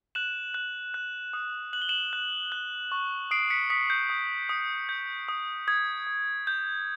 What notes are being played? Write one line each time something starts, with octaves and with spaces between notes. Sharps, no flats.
F#6 E7 F#7
F#6
F#6
D#6
F#6 F#7
G7
E7 F#7
F#6
F#6
C#6
D#6 C7 D7
B6 C#7
D#6 B6 C#7
G6
D#6
D#6
G6
D#6
D#6 G#6
D#6
G6